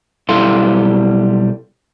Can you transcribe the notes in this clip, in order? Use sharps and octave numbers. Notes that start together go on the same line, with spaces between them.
B1 G3 E4 A4 F5 C6